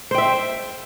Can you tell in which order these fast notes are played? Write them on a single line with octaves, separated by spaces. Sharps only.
C5 G5 E5